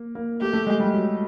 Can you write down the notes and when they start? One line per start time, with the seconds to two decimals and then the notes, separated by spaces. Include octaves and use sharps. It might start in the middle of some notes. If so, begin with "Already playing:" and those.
Already playing: A#3
0.15 A#3
0.41 A3 G4
0.53 A3
0.67 G#3
0.80 G3
0.93 F#3